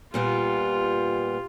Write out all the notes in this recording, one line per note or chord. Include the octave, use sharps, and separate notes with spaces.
A#2 G3 B3 F4 G4